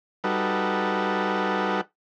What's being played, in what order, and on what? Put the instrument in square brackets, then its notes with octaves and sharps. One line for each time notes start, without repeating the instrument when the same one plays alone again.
[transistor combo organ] G3 D#4 F#4 A4 B4